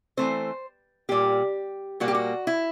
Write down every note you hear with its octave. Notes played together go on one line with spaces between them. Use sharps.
E3 A3 C4 C5
A#2 G3 A#3 G4
A#2 G3 A#3 F#4
G4
F#4
E4